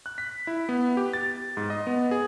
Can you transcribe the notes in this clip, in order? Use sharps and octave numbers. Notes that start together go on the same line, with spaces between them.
F#6
B6
E4
B3
G4
A6
G#2
D#5
B3
G#4